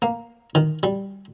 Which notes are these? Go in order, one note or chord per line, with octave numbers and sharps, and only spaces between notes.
A#3
D#3
G3